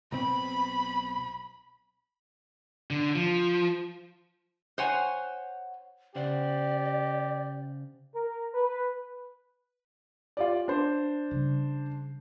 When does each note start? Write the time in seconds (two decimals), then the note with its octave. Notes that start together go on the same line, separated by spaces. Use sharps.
0.12 B1 C4 B5
2.90 D3
3.15 F3
4.78 C5 C#5 F#5 G#5
6.15 C#3 G4 C5 D5 F#5
8.14 A#4
8.54 B4
10.37 F4 G4 D5
10.68 D4 C5
11.31 C#3 G3